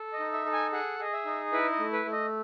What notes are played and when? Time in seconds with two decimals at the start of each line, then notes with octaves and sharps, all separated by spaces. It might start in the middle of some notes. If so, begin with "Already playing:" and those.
Already playing: A4
0.13 D#5
0.19 D#4
0.33 E5
0.46 A4
0.53 G#5
0.72 G#4 F#5
0.99 G#4 D#5
1.13 E5
1.25 D#4
1.52 E4 B4
1.72 D#5
1.79 A3
1.93 B4
2.06 A3
2.12 D#5